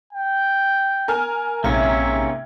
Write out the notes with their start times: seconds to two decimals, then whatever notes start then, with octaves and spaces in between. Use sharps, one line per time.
0.13 G5
1.08 A#4 G#5 F6
1.64 A#1 G#2 C3 A#3 C#4 E5 F5 G#6